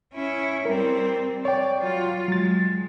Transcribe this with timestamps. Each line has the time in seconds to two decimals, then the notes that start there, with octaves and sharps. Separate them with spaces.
0.13 C#4 E4
0.65 G3 C4 A#4
1.45 C#5 D5 G5
1.77 F#3 F4
2.28 F#3 G#3 A6